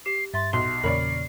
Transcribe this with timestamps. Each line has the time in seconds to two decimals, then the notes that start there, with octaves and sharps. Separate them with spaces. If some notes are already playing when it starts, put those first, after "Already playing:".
0.06 G4 C7
0.34 G2 E5 C6 A6
0.53 B1 C6 C7
0.84 E2 A#2 C#3 A#4 C#5 D5 B5